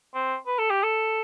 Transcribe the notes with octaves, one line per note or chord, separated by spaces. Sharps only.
C4
B4
A4
G4
A4